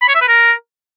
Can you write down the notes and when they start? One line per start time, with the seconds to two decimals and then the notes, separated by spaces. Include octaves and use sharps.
0.02 B5
0.09 C#5
0.15 E5
0.22 B4
0.28 A#4